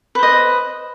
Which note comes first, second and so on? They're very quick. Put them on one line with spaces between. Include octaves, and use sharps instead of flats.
B4 C5 D#5